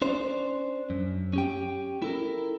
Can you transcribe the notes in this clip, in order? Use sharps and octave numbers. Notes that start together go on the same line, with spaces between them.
C#4 D4 C5
F#2
C#4 G4 G5
E4 A4 A#4